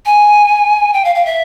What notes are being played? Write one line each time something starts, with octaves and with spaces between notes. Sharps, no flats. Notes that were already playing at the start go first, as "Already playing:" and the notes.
G#5
G5
F5
F5
E5